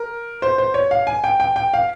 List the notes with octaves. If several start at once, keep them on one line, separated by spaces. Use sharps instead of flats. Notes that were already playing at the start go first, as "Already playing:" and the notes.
Already playing: A#4
C5
C5
C#5
F5
G#5
G5
G5
G5
F5